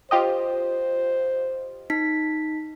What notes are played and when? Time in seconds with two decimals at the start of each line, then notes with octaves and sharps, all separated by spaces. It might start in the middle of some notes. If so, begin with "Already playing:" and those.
0.11 F4 G4 C5 D#5
1.90 D#4 B6